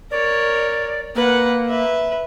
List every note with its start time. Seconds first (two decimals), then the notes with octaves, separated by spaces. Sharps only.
0.11 A#4 C#5 D5
1.15 A#3 B4 F#5
1.67 B4 E5